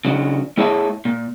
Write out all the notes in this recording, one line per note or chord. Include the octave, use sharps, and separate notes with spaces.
C#3 F#3 D4
A3 E4 G#4 C#5 E5 A5
A#2